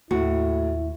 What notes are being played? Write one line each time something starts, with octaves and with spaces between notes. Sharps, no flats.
D#2 A2 E4 F#4